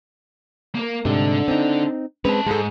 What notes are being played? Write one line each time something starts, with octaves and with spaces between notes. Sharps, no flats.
A#3 A#4
G#2 C3 G3 D4 A4
C4 D#4
G#3 C4 C#4 B4 A5
G#2 G#3 A4